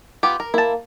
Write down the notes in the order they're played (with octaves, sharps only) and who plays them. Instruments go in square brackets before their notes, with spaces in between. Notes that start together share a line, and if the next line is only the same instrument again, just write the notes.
[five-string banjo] B3 F4 G4
A#4
[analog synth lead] A#3 [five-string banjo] E4 A5